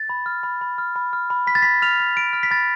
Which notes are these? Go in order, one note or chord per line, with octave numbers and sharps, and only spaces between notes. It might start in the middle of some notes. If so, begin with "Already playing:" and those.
Already playing: A6
B5
F6
B5
B5
F6
B5
F6
B5
B5 B6
A6
B5 B6
F6 F7
F6
B5 D7
F6
B6
B5 A6